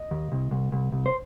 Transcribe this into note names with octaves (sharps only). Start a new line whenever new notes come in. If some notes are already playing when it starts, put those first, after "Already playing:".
Already playing: D#5
D#2
C2
C2
C2
C2
C5